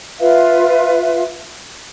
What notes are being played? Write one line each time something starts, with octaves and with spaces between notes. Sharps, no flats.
F4 B4 E5 F5